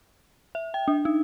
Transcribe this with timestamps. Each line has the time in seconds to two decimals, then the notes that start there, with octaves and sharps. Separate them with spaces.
0.55 E5
0.74 G5
0.88 D4
1.05 D#4